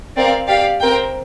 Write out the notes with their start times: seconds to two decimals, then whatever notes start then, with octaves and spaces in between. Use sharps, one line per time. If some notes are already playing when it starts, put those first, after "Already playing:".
0.16 C4 A#4 D5 F5
0.47 G4 D5 F5
0.80 C4 A#4 G5